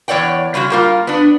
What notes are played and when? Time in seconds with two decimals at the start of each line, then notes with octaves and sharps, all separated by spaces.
0.08 E2 C#5 D5 F#5 G5
0.54 C#3 G3 G#3 F#4
0.70 G3 A#3 F4
1.07 B3 D4